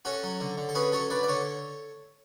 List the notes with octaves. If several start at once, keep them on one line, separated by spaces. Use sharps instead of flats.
C#4 F#4 A4
F#3
D3
D3
A4
C#4 G#4 B4
F#3 A4 C#5
D3 B4 D5
D5
D3 A4 C#5